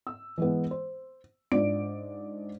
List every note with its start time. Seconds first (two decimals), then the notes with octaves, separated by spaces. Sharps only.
0.07 E6
0.38 E3 G#3 B3
0.71 C5
1.52 G#2 D4 F4 D5 D7